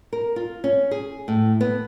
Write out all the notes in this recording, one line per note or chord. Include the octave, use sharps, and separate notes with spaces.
A#4
F4
C#4
G#4
A2
B3